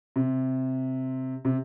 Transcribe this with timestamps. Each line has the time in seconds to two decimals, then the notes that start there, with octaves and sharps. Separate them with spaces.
0.16 C3
1.45 C3